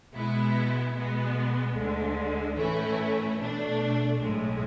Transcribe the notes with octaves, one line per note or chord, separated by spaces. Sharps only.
B2 G#3 B3 E4
B2 G#3 B3
D2 D3 G#3
A2 E3 A3 C#4 E4
B2 A3 D4
B1 A2 G#3